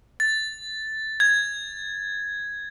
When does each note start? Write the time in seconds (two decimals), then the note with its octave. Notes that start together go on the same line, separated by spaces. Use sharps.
0.20 A6
1.20 G#6